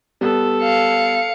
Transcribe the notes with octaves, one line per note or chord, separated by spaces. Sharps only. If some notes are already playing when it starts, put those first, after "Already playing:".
G3 B3 A4
F5 C#7